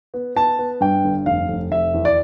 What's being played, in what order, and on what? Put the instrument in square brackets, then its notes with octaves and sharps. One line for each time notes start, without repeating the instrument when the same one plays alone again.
[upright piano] B3
B3 A5
B3
G2 G5
G1
F1 F5
F1
F1 E5
E2
D5